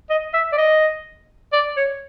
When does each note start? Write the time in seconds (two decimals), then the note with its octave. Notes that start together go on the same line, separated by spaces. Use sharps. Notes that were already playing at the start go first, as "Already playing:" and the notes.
0.10 D#5
0.34 E5
0.52 D5
0.58 D#5
1.53 D5
1.77 C#5